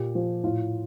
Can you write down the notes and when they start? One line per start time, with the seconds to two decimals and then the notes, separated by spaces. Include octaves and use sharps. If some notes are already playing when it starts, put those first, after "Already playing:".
Already playing: A#2 G4
0.15 F3
0.44 A2 F4